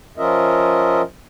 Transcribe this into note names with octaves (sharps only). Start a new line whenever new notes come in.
F3 C#4 F4 A#4 D#5 E5